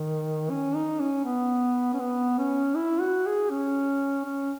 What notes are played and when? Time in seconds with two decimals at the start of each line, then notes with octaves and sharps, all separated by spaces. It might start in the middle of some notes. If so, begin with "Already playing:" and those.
Already playing: D#3
0.50 C#4
0.75 D#4
1.00 C#4
1.25 B3
1.93 C#4
2.00 B3
2.38 C#4
2.75 E4
3.01 F#4
3.26 G#4
3.50 C#4
4.25 C#4